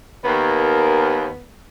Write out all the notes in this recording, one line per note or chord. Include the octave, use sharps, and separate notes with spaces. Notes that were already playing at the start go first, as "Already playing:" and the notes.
D#2 B3 A#4